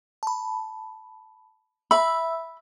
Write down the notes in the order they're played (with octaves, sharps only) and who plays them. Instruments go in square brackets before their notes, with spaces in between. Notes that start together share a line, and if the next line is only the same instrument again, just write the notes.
[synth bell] A5 B5
[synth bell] E5 E6 [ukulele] B5